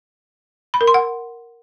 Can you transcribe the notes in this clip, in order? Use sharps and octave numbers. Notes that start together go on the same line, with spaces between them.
B5
A#4
C6
F#5